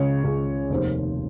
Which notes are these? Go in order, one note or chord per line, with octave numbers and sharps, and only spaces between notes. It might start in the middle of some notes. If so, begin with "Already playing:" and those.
Already playing: C#2 C#3 G#3 C#5
C#2 C#3 G#3
F1 D#2 D#3 C5